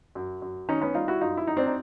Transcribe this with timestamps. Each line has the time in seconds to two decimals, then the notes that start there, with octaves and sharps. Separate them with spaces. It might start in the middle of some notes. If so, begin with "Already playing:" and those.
0.15 F#2
0.42 F#2
0.69 D#3 C#4 D#4
0.81 B3 C#4
0.94 G3 D#4 F4
1.08 E4 F#4
1.21 F#2 D#4 F4
1.37 E4
1.47 F#2 D#4
1.57 C4 D4
1.66 D#4